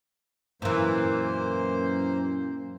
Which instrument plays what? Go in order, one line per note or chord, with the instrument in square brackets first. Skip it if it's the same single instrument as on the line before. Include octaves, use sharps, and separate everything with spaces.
[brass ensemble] F#2 [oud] A#2 E3 [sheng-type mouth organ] A#3 C5